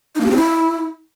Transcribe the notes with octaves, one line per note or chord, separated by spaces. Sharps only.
D#4
A#3
G4
C4
E4